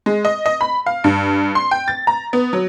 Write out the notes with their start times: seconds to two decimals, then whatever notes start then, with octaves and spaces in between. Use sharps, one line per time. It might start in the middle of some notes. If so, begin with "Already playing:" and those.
0.06 G#3
0.25 D#5
0.46 D#5
0.61 B5
0.86 F5
1.04 G2
1.55 C6
1.71 G5
1.88 A6
2.07 A#5
2.33 B3
2.53 F#3